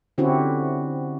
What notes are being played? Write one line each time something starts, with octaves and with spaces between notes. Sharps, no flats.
D3 C4 C#4 E4 F#4 G4